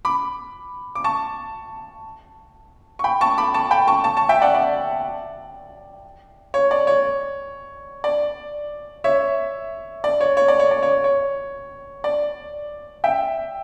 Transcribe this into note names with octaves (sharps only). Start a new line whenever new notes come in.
B5 D6
D6
A5 C#6
C#6
G5 B5
A5 C#6
B5 D6
A5 C#6
G5 B5
A5 C#6
A5 C#6
A5 C#6
E5 G5
D5 F#5
D5
C#5
D5
C#5
D5
C#5 E5
D5
C#5
C#5
D5
C#5
D5
C#5
C#5
D5
E5 G5